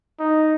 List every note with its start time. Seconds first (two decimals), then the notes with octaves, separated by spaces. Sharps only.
0.20 D#4